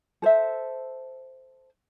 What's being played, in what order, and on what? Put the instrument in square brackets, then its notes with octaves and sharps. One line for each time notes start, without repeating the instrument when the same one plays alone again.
[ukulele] A4 C5 E5